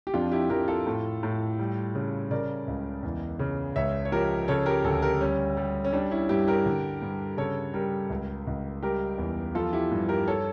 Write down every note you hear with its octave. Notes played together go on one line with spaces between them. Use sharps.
G4
F2 D4 F4
E4 G4
F2 G4 A#4
F4 A4
A2
A2
G3
C#3
C#3 A#4 D5
C#2
E2
C#3
C#2 C#5 E5
C#5
F3 G4 A#4
C#3 A4 C#5
G4 A#4
D2 A4 C#5
G4 A#4
G3 C#4
G3
C#4
G3 D4
C#4 E4
G2 E4 G4
G4 A#4
D3
G2
C#3 A4 C#5
G3 G4 A#4
C#2
C#2
G3 G4 A#4
E2
F3 F4 A4
E4 G4
G2
G4 A#4
A4 C#5